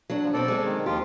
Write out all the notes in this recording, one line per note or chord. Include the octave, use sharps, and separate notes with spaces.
F#3 D4
F3
B2 F#3 C4 A4 D5
G#3 C4
D#3
D#2 F3 F4 G4